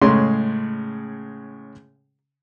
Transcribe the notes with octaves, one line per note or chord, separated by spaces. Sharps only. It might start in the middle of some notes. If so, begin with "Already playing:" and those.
A2 C#3 G#3 C#5 C6